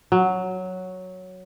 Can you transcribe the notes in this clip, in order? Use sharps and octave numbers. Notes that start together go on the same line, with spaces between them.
F#3